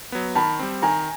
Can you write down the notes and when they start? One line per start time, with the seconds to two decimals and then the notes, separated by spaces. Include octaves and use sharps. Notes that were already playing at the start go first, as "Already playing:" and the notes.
0.12 F#3 B3
0.35 D#3 A5 B5
0.59 G3 C4
0.82 D#3 G#5 A#5